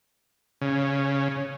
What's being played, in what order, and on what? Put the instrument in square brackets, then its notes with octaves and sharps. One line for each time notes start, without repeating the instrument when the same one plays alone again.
[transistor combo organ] C#3